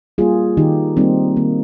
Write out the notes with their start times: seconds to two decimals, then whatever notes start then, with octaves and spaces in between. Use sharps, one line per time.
0.18 G3 A#3 F4 G#4
0.57 D#3 D#4 G4
0.97 G3 A#3 C4 D#4
1.36 D#3 A#3